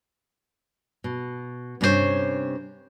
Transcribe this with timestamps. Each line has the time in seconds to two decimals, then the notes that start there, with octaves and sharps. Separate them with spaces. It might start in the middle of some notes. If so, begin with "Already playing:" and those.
1.04 B2
1.81 G2 C3 C#4 D4 C5 C#5